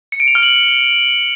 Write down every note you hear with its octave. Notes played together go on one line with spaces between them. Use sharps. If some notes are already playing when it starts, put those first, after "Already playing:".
C#7
D7
F7
F6
F#7